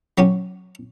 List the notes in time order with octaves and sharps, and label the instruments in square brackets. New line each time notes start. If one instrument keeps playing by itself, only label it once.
[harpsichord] F#3 C#4 G4